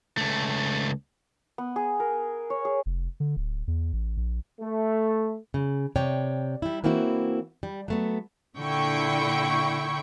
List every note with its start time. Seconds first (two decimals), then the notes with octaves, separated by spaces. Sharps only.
0.18 C#2 A3
1.58 B3
1.76 G#4
2.00 A#4
2.50 C#5
2.65 G#4
2.86 F1
3.20 D3
3.36 D1
3.67 E2
3.93 A1
4.17 A#1
4.61 A3
5.54 C#3
5.96 C3 C#5 D5 G5
6.62 G3 E4
6.84 E3 A#3 C4 E4 F#4
7.63 G3
7.88 F#3 A3 B3
8.58 A#2 D3 E4 G5 C#6